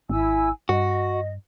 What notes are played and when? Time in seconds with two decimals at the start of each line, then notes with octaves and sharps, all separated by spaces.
0.10 G#1 E4 G#5 E6
0.69 G2 F#4 D#5